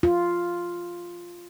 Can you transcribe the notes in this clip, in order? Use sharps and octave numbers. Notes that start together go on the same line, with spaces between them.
F4